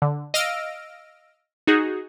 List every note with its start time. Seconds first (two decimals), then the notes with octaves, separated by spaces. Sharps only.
0.02 D3
0.34 D#5 F5 E6 F6 A#6 D7
1.67 D#4 F#4 G#4